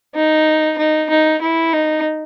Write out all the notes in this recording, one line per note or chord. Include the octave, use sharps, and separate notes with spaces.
D#4
D#4
D#4
E4
D#4